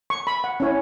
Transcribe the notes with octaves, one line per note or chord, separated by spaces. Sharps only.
C#6
B5
F#5
C#4 E4 C#5